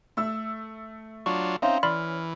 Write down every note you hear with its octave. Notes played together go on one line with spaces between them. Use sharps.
A3 E6
F#3 D4 F4 C#6
C4 C#4 D#4 E5 F5 C6
E3 D5 B5 C6 F6